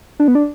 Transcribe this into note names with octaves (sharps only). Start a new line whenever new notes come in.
D4
B3
D4